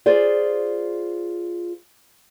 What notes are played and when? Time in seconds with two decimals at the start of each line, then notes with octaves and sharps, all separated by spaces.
0.06 F4 G#4 C5 D5